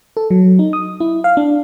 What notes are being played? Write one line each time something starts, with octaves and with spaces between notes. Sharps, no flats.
A4
F#3
D#4
D#6
E4
F5
D4